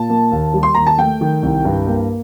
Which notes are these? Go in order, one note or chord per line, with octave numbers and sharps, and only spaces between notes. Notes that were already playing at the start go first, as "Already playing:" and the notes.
Already playing: A#2 A5
A#3
D#2
G3
C6
D#2 A#5
A5
A3 G5
D#3
C2
G2
A#3